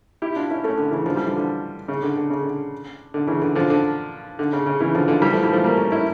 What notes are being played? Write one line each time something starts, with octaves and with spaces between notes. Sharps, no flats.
E4 G4
D4 F4
C#4 E4
A3 C#4
D3
C#3 E3
D3 F3
E3 G3
D3 F3
D3
C#3
D3
D3
C#3
D3
D3
C#3 E3
D3
D3 F3
D3
D3
C#3
C#3
C#3 E3
D3 F3
D3 F3
E3 G3
F3 A3
E3 G3
F3 A3
G3 A#3
A3 C#4
C#4 E4